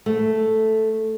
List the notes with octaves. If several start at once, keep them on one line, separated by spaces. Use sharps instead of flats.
A3